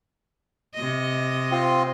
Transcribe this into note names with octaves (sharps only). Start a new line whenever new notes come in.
C3 D#5
C4 F4